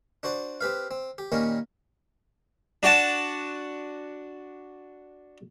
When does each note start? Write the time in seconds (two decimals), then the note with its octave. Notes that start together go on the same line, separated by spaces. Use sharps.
0.23 D4 F#4 C5 D5
0.61 C4 G4 B4 F5
0.91 C4
1.18 G4
1.32 A#2 D#3 G3 A#3 C#4
2.83 D4 F#4 F#5 A5